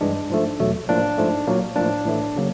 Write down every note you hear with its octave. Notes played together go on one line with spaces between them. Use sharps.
G2 E3 G#3 D4
G#2 F3 A3
E2 B2 F#3 A3
A2 F3 A#3 D4
G#2 F3 A3
A#2 F#3 A#3
A2 F3 A#3 D4
A2 E3 A3
C#3 F#3 A#3